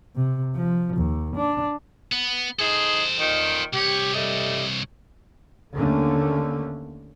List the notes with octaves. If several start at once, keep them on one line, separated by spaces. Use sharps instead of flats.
C3
F3
D#2
D4
B3
D#4 G#4 A4 C5
A#2 D#3
C2 G4 C#5
G3 A3 D#5
D#2 D3 A3 A#3 C#4